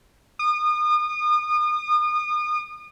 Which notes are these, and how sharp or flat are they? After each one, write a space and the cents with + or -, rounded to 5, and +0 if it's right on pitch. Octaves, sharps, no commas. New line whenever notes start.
D#6 -35